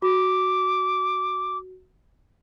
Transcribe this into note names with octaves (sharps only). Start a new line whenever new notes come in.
F#4 D6